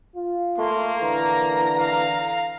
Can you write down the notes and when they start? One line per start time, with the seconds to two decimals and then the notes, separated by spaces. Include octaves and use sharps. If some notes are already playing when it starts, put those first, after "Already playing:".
0.16 F4
0.58 A3 A#3 C6
1.01 D3 E3 A#5
1.77 F5